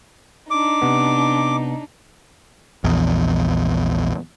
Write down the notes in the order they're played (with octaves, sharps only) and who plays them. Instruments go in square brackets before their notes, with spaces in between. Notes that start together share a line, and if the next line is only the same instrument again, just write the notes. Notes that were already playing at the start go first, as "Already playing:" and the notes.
[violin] D4 D#4 [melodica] D6
[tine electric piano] C3 B3
[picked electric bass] A#1 E2